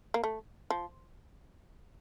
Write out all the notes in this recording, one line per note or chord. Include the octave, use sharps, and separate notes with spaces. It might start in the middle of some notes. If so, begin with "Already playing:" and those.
A#3
A3
F3